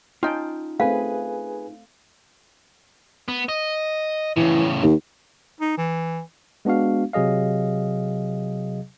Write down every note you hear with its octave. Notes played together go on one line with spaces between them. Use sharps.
C#4 D#4 F4 G5 A5
A3 C4 G#4 B4 F5 G#5
B3
D#5
A2 C#3 E3
D#2
D#4
E3
G#3 B3 D4 F#4 F5
C3 F#3 G#4 D#5 F5